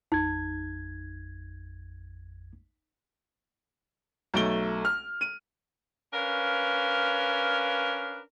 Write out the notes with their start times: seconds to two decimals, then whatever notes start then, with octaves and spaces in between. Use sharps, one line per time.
0.12 A1 F2 D#4 G#6
4.34 B1 A3 D7 G7
4.85 F6
5.21 D#7
6.14 C#4 D4 A#4 B4 F5